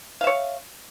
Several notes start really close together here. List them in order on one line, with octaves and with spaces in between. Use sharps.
F5 E5 C#5